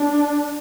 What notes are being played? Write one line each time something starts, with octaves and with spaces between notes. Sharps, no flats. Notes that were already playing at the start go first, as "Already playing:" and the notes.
Already playing: D4